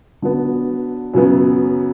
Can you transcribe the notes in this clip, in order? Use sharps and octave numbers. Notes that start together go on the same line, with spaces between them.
D3 F#3 B3
F#2 C#3 F#3 B3